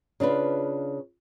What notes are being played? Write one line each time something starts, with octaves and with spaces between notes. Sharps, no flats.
C#3 D4 F4 B4